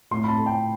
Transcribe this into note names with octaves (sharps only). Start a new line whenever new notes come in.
A2 C6
B5
A5
A3
G5